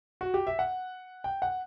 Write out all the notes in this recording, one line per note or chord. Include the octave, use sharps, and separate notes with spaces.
F#4
G4
E5
F#5
G5
F#5